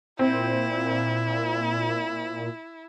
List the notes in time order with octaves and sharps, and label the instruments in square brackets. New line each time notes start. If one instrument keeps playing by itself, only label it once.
[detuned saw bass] A#2 [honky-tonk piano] C4 [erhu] E4